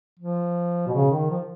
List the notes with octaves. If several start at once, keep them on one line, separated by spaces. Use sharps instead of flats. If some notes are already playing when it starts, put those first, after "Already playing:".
F3
B2
C#3
D#3
F3